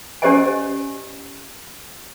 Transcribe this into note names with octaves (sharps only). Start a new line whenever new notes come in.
C#4 G4 C5 D5 D#5 G#5